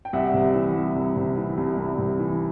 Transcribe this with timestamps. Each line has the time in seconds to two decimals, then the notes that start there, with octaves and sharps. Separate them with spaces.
0.05 G5
0.13 C2 E5 F#5
0.34 C3
0.55 E3
0.75 C2
0.96 C2
1.16 C3
1.37 E3
1.57 C2
1.77 C2
1.98 C3
2.19 E3